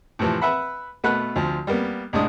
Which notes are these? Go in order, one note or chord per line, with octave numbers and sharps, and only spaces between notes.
A2 C3 E3 F3
B4 E5 F#5 B5
B2 A3 B4 F#5 F#6
D2 F3
G3 A#3 B3
C2 A2 G#3 D4 D#6